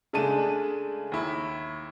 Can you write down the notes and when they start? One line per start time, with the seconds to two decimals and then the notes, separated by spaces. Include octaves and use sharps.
0.13 C#3 G#3 A3 D4 A5 D#7
1.12 D#2 E4